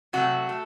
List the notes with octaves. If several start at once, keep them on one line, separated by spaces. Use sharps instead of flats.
C3 F#3 A3 F#4
A3